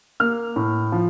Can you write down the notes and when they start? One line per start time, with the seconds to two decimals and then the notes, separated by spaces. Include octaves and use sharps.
0.20 A#3 F6
0.56 A2
0.92 F3